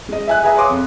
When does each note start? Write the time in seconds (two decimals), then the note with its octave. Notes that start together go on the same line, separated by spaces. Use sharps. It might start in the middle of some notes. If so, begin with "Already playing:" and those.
0.09 G#3 D#5
0.27 E5 G#5 F#6
0.43 G#4 B4 E5 G#5 A#5
0.56 C#5 F5 C6 D6 D#6
0.70 F2